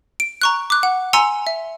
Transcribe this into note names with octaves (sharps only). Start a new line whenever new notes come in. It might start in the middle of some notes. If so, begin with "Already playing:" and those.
D7
A#5 C#6 F#6
D6 F#6
F#5
G#5 A#5 C6 E6 C#7
E5